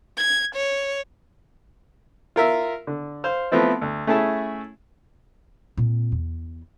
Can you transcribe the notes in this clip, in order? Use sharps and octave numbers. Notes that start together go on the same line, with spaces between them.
G#6
C#5
F4 A#4 E5
D3
C5 F5
F3 A3 B3 C4 E4
D2
A3 C#4 E4 G#4 A5
A#2 C4
E2